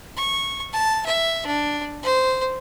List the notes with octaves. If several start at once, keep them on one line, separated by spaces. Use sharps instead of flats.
C#6
A5
E5
D4
C5